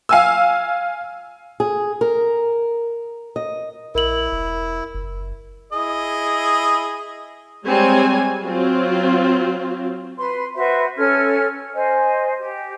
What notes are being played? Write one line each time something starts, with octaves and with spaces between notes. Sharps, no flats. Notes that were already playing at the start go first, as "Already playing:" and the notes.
F5 G#5 E6
G#4
A#4
D#5
A#1 E4 A#4 F#7
E1
F#1
E4 G#4 D#5
G3 G#3 C4 C#5 G#5
F#3 C4 F4
B4 C6
F#4 B4 C5 E5
C#4 A4 F6 G#6
C5 D#5 G#5
G4